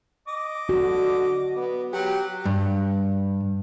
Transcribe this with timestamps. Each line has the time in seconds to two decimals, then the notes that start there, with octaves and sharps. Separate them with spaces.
0.28 D#5 D6
0.69 D3 F#4
1.57 B3
1.93 F#3 G4 F#5
2.46 G2